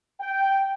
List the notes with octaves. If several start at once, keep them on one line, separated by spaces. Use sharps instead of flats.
G5